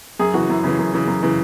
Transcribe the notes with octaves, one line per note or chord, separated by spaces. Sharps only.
F#2 G#4
C#3 E3 F#4
F#2 E4
C#3 E3
F#2
C#3 E3
F#2
C#3 E3